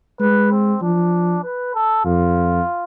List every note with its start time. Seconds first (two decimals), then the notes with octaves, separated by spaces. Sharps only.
0.20 G#3 B4
0.51 C4
0.82 F3 D4
1.44 B4
1.75 A4
2.05 F2 F4